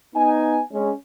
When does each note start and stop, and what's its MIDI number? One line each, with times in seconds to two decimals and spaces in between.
0.15 0.59 59
0.15 0.59 63
0.15 0.59 80
0.73 0.91 56
0.73 0.91 61